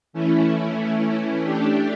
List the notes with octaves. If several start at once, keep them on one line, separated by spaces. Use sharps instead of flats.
E3 A3 C#4 E4
A3 D4 G4